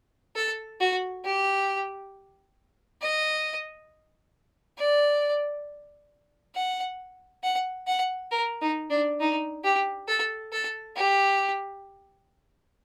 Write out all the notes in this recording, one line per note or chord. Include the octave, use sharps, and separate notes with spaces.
A4
F#4
G4
D#5
D5
F#5
F#5
F#5
A#4
D#4
D4
D#4
G4
A4
A4
G4